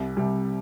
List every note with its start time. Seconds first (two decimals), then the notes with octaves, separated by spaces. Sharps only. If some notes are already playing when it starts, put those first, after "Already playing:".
Already playing: C2 C3 G3
0.17 C2 C3 G3